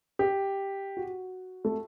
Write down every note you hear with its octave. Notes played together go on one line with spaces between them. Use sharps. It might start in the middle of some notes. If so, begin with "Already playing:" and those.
G4
F#4
A3